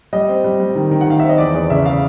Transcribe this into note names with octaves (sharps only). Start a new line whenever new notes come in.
G3 D#5
C4
G3
G3
D#3
D#3
F#5
D#3 F5
C4 E5
D#5
E2 D5
E2 D5
C#3 E5
F5